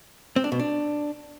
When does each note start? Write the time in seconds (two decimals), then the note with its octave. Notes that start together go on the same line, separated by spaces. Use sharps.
0.36 C4
0.44 D4
0.52 B2
0.59 D4